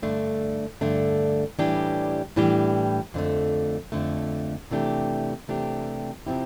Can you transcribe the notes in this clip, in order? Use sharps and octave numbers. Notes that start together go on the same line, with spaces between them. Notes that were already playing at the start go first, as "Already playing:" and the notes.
G2 D3 A3 D4
G2 D3 A3 D4
A2 E3 G3 D4 G4
A2 E3 G3 D4 G4
F2 D3 A3
F2 D3 A3
C3 E3 A3 D4 G4
C3 E3 A3 D4 G4
C3 F3 C4 E4 G4